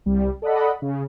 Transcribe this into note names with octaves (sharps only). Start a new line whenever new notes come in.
C2 G3
A4 D5 D#5 F#5 B5
C#3